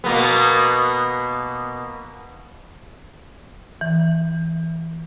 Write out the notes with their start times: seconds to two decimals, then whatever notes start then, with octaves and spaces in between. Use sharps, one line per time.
0.04 B2 A#3 B3
3.81 E3